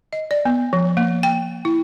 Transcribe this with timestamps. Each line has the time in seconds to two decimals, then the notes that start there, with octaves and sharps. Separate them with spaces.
0.13 D#5
0.31 D5
0.45 B3
0.73 F3
0.97 A#3
1.23 G5
1.65 E4